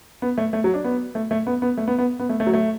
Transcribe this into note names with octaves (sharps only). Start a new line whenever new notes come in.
B3
A3
A3
F#3
D4
B3
A3
A3
B3
B3
A3
B3
B3
B3
A3
A3
F#3
A3